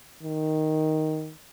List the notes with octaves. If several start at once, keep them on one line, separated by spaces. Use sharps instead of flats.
D#3